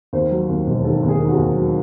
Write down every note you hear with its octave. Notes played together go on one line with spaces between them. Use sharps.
D#2 C5
F#3
D#2
E1
D#3 A4
D#2
G#4
D#3
F#4
G#4
D#2
F#3